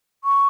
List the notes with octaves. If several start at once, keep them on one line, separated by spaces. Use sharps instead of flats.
C#6